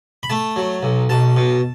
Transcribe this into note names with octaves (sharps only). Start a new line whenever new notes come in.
B5
A3 A5
F#3
B1
B1 A5
B2